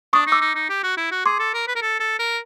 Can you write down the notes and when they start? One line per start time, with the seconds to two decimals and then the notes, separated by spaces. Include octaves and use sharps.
0.13 D4 C#6 D#6
0.27 D#4
0.32 D6 E6
0.41 D#4
0.55 D#4
0.70 G4
0.83 F#4
0.97 E4
1.12 F#4
1.26 G#4 C6 D6
1.39 A4
1.54 A#4
1.67 B4
1.75 A#4
1.82 A4
2.00 A4
2.19 A#4